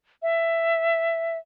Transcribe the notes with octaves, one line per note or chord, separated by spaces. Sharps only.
E5